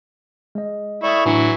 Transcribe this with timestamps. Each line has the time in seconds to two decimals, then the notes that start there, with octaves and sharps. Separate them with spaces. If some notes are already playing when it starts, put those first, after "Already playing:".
0.55 G#3 D#5
1.03 E4 D5 C#6 D#6
1.26 A2 E3 F#3 D4 C#7